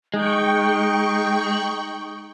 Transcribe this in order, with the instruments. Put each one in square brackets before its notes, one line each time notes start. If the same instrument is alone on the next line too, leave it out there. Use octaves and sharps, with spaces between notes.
[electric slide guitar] G#3 [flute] D#4 [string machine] G5 C#6